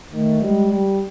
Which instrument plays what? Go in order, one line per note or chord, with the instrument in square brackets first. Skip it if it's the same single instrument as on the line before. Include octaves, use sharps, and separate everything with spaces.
[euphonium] D#3 [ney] A3
[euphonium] G3 [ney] G#3
[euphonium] G3